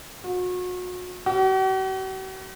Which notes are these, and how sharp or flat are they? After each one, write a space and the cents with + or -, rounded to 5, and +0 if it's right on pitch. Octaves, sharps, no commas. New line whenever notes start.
F#4 -35
F#4 +45